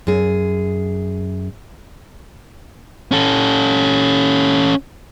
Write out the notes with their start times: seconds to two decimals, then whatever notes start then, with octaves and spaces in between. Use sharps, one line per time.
0.07 F#2 G#4
3.12 C#4 A4